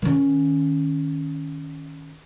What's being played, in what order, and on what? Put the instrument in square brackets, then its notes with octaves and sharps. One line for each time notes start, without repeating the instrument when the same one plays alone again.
[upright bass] D#3 C#4